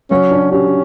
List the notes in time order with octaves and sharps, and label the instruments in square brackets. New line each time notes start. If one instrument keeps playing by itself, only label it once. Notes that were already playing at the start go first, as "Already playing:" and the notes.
[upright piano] F#3 [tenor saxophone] C#4
[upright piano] D4
[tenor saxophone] C#4 [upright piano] G4